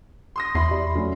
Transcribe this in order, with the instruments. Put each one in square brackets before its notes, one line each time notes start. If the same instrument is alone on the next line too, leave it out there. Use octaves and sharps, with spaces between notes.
[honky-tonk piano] C6 D#6 A#6
[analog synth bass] E2 [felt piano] E4 [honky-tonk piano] B5 C6 C7
[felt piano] G4 D5 E5
F#3 A3 C#4